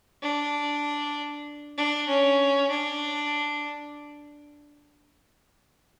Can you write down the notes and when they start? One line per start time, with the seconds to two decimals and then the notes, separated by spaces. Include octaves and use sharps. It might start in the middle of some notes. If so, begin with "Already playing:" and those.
0.22 D4
1.77 D4
2.08 C#4
2.70 D4